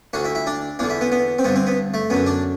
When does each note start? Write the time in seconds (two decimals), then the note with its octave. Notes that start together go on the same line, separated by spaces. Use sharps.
0.13 D2 D3 F#4
0.25 E4
0.35 E4
0.47 D4
0.79 E2 D3 D4
0.90 E4
1.01 B3
1.12 B3
1.39 C4
1.44 G2 D3 B3
1.56 C4
1.67 B3
1.94 A3
2.10 F#2 D3 B3
2.27 D4